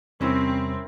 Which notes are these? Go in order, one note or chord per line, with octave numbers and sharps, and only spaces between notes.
E2 C3 G3 C4 C#4 E4 A#4